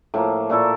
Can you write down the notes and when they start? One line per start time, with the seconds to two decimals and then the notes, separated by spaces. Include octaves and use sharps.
0.14 A2 F3 A#3
0.50 A#2 A3 E4 A4